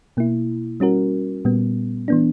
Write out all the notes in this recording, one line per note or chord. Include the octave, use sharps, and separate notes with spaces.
B2 A#3 E4
G3 C#4 F#4 A#4
A#2 G3 B3
E3 B3 D4